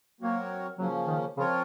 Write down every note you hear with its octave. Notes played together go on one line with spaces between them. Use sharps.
F#3 A#3 C4 F#4 A#4 C#5
C#3 F3 F#3 A#3 C#4
D#3
C#3 F3 C4 F4 A#4 C#5